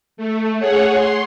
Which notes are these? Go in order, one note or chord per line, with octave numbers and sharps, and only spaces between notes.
A3
G#4 C#5 F#5
C6